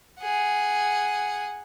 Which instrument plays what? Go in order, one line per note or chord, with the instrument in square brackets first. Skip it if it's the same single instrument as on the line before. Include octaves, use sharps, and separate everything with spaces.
[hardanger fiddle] G#4 F#5